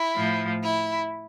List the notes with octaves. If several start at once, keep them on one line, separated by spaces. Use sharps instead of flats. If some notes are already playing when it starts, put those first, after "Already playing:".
Already playing: E4
A2 F3
E4